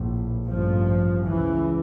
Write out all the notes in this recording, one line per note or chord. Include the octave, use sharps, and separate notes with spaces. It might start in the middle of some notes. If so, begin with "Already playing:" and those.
Already playing: A#1 A2
A1 G2 F3
C#2 C#3 E3